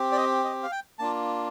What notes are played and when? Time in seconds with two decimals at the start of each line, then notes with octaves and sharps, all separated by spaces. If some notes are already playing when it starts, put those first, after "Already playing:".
Already playing: C4 G4
0.12 D5
0.17 D#5
0.44 D#5
0.63 F5
0.72 G5
0.99 A#3 D4 F4 A5